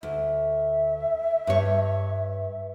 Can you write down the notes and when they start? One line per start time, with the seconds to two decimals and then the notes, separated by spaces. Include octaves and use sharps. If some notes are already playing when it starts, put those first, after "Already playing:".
0.03 D2 E5
1.47 G2 C#5